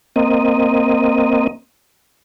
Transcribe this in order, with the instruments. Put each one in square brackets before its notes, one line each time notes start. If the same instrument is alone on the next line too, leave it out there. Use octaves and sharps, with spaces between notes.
[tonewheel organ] A#3 C4 D#5